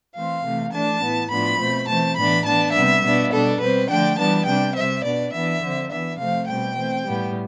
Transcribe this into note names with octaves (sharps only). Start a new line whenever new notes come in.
E3 A3 C4 F5
C3 E3 A3
E3 A3 D4 A5
A2 E3 B3
A2 F3 B3 D4 B5
B2 A3 C4
E3 A3 C4 A5
A2 E3 B3 D4 B5
E3 B3 D4 A5
C3 G3 B3 E5
B2 B3 D4
B2 G3 D4 A4
B2 G3 C4 B4
D3 F3 A3 D4 G5
E3 G3 B3 D4 A5
C3 G3 D4 G5
C3 G3 C4 E5
B2 B3 D4 D5
E3 B3 D4 E5
D3 F3 C4
E3 B3 D4 E5
C3 F3 A3 C4 F5
B2 G3 C4 G5
E3 A3 C4
A2 G3 B3